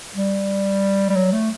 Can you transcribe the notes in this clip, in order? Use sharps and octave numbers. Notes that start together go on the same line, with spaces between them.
G3
G3
F#3
A3